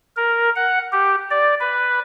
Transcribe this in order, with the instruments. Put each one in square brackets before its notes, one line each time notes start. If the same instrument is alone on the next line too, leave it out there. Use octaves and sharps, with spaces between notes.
[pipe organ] A#4
F#5
G4
D5
B4